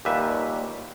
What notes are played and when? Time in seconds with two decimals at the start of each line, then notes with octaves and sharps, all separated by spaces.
0.05 D#2 A#2 G3 B4 E5